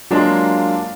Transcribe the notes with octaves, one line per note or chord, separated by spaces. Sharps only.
F#3 G#3 A#3 D4 F4